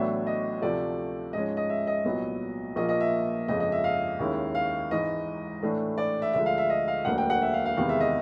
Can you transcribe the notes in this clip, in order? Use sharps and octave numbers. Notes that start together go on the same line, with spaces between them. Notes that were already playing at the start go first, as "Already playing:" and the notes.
Already playing: A1 A2 F#3 B3 D4 E5
D#5
D2 C3 F3 A3 D5
G#2 F3 G#3 C#4 D#5
D#5
E5
D#5
C2 A#2 F#3 B3
A#1 A#2 F3 A#3 D#5
D#5
E5
G1 F2 C#3 F3 G#3 D#5
D#5
E5
F5
D#2 D#3 G#3 C#4 E4
F5
G#1 G#2 E3 D#5
A2 E3 A3 D4
D5
E5
D2 D3 F3 G#3 E5
F5
E5
D#5
F5
E1 D2 D3 F#3 A#3 F#5
G5
F#5
E5
F5
F5
E2 C3 D#3 G#3 B3 F5
E5
D#5